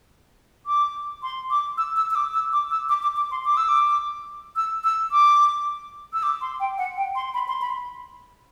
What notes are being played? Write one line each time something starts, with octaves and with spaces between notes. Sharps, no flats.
D6
C6
D6
E6
E6
E6
D6
E6
D6
E6
D6
D6
D6
C6
D6
E6
D6
E6
E6
D6
E6
D6
C6
G5
F#5
G5
C6
B5
C6
B5